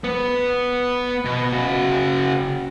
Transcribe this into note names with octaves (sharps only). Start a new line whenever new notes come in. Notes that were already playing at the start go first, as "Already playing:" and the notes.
B3 B4
B2
C#3 F#4